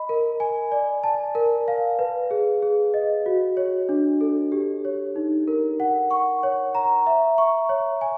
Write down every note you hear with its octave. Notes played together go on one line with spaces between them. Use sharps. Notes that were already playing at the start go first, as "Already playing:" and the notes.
Already playing: D#5 B5
A#4
G#5
D5
A5
A#4
F5
B4
G#4
G#4
D#5
F#4
C#5
D4
A4
G4
C#5
D#4
A#4
F#5
C#6
C#5
A#5
E5
C#6
C#5
G#5